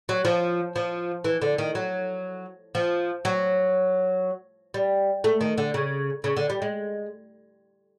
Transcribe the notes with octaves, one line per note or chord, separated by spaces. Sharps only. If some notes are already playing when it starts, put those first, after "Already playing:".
F#3
F3
F3
E3
D3
D#3
F#3
F3
F#3
G3
A3
D#3
D3
C#3
C#3
D3
G3
G#3